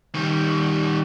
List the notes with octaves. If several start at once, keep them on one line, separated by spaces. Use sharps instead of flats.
D#3 G3